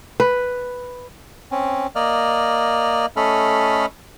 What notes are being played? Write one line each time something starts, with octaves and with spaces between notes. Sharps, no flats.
B4
C4 C#4
A#3 D5 D#5 F6
A3 C#4 A4 D#5 B5 F6